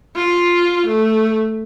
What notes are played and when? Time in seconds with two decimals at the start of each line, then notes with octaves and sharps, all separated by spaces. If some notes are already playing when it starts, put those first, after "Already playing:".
0.16 F4
0.87 A3